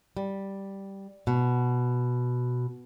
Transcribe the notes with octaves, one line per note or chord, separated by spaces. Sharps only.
G3
B2